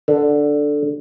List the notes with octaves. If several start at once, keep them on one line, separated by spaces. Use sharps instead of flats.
D3